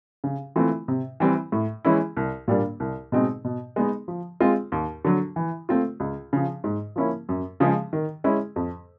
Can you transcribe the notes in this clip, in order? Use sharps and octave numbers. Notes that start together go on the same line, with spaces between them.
C#3
E3 A3 C4 F4
C3
E3 G3 C4
A2
E3 G#3 C#4 E4
C2
A#2 G3 A#3 D4
C2
B2 G#3 C4 D#4
B2
G#3 B3 D#4
F3
G#3 C4 F4
D#2
D3 F#3
E3
A3 C4 F4
C#2
C#3 F3
G#2
F3 A#3 C#4 E4
F#2
C#3 F3 G#3
D#3
G#3 C#4 E4
F2